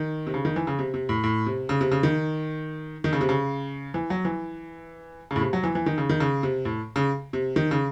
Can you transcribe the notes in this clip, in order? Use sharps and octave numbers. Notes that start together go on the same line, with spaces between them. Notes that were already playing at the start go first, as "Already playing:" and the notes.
Already playing: D#3
C3
C#3
D#3
E3
C#3
C3
C3
A2
A2
C3
C#3
C3
C#3
D#3
D#3
C#3
C3
C#3
E3
F#3
E3
A2 C#3
C3
F#3
E3
E3
D#3
C#3
D#3
C#3
C3
A2
C#3
C3
D#3
C#3